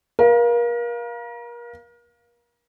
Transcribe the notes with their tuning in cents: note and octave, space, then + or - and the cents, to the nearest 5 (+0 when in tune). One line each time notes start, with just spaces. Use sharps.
A#4 +35 F5 +0